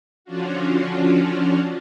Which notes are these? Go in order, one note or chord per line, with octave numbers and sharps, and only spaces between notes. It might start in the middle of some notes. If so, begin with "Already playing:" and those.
D3 F3 C#4 D4 F4 F#4